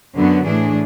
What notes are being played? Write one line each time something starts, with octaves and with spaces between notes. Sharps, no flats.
F#2 D3 F#3 B3 F#4
A2 E3 A3 D4 G#4